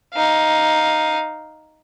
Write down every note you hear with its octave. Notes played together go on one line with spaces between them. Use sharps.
D#4 F5